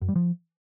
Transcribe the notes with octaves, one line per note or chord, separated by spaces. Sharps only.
F#2
G3
F3